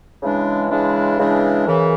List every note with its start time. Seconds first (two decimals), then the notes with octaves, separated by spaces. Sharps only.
0.22 C#3 E3 G#3 D4
0.70 C#3 E3 G#3 D4
1.18 C#3 E3 G#3 D4
1.65 F#2 C#3 E3